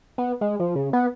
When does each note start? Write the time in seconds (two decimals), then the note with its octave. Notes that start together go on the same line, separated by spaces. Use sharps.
0.18 B3
0.41 G#3
0.60 F3
0.75 C#3
0.93 B3